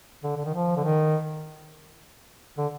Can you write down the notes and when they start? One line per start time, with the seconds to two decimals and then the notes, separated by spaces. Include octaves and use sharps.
0.24 D3
0.37 D3
0.45 D#3
0.54 F3
0.76 D3
0.84 D#3
2.58 D3